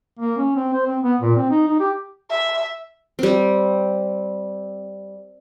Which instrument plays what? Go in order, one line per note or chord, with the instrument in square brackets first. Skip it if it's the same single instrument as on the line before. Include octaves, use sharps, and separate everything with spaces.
[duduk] A#3
C#4
C4
C5
C4
B3
A#2
C4
D#4
D#4
G4
[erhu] E5
[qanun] G3 C4